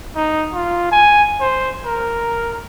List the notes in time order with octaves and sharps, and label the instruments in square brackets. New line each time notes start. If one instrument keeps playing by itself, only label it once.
[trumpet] D#4
F4
G#5
C5
A#4